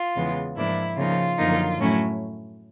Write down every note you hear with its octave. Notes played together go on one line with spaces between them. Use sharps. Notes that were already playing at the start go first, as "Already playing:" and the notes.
Already playing: F4
E2 C#3 E3 G#3 B3
G#2 F3 A#3 D4 E4
C#3 F3 A#3 D#4 F4
F#2 D3 F3 A#3 D#4
A2 F#3 A3 C#4 E4